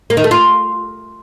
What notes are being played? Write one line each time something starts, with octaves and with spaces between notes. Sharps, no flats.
A#3
D#3
A3
F4